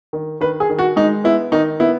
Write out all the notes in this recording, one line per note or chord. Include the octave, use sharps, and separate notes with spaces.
D#3
D#3 B4
G#4
D#3
F#4
G#3 D#4
B3 E4
D#3 D#4
B3 E4